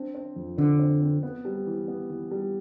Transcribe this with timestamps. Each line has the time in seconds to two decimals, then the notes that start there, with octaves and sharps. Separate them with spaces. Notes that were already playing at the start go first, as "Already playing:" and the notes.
Already playing: C4 D4
0.15 C4
0.36 F2
0.57 D3 C4
0.79 C4
1.02 C4
1.23 B3
1.45 G3
1.67 E3
1.88 B3
2.10 E3
2.31 G3